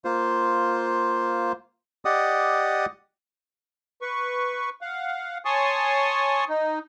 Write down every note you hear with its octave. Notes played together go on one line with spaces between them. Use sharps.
A#3 F4 C5
G4 D5 D#5 F#5 D#6
B4 C#6
F5 F#5
C#5 G#5 A5 C6 C#6 D#6
D#4